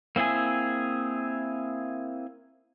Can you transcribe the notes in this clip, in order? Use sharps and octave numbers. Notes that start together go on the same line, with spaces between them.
A#3 C4 E4 G#4 G#5